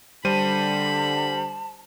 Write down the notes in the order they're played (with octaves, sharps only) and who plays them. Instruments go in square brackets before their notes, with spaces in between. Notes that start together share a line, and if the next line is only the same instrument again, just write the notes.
[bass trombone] D3 [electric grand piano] G3 C5 D#7 [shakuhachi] A5 [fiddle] B5